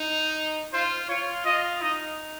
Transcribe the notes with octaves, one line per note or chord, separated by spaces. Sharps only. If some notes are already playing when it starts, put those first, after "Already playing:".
Already playing: D#4
F4 C5
F4 C#5
F4 D#5
D#4 D#5